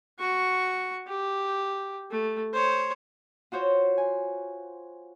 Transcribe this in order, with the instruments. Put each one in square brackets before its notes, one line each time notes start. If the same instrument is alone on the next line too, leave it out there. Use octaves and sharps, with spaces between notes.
[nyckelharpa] F#4 C#6
G4
A3
C5 C#5
[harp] F4 F#4 C5 C#5
G#5